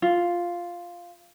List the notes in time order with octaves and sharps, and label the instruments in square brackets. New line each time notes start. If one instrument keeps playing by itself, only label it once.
[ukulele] F4